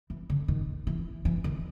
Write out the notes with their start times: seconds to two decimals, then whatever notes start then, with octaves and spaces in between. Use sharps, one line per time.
0.10 E3
0.30 D3
0.48 D#3
0.87 E3
1.25 E3
1.44 D#3